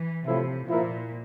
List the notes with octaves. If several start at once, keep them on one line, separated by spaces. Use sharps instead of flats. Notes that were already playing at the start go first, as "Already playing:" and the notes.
Already playing: E3
A2 C3 F3 C4 E4
A#2 F3 A#3 E4 A#4